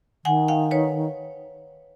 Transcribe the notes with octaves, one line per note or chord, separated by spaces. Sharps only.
D#3 F#5 G#5
F5 G5
B4 C#5